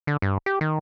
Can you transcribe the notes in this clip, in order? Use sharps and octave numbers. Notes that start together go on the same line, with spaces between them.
D3
G2
G4
D#3